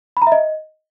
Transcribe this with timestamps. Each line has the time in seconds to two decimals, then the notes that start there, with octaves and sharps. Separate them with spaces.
0.17 B5
0.22 A#5
0.27 E5
0.32 D#5